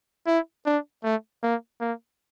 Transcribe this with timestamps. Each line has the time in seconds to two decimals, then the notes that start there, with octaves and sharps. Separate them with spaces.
0.27 E4
0.66 D4
1.04 A3
1.43 A#3
1.81 A#3